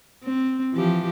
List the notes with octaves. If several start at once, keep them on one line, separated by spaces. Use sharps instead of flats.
C4
E3 F3 G4